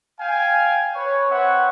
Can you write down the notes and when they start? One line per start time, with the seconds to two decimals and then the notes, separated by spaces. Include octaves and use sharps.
0.20 F5 G5 G#5
0.95 B4 C#5
1.30 C4 B4 C#5 E5 F#5